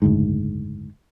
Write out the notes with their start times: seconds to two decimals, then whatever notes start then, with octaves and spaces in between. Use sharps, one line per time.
0.02 F#1 D2 G#2